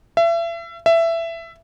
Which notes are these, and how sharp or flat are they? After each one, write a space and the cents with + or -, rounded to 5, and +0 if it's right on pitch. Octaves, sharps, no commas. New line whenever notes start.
E5 +35
E5 +15